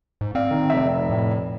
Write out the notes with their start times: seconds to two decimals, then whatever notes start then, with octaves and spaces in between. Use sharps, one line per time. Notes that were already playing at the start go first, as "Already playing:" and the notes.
0.21 G#2
0.35 C4 D5 F5
0.51 D#3
0.70 F1 E5
1.10 A2